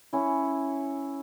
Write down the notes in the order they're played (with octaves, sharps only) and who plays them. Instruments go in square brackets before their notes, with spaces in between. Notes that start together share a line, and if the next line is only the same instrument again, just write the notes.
[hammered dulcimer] C#4 E4